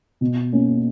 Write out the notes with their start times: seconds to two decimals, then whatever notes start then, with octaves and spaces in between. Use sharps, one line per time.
0.21 B2
0.52 A#3 C#4